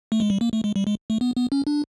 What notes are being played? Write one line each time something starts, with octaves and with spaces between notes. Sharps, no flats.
A3
G#3
G3
A#3
A3
G#3
G3
G#3
A3
B3
B3
C#4
D4